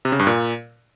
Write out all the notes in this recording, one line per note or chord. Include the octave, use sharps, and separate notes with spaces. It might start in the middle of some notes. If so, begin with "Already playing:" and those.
C3
C#3
G2
A#2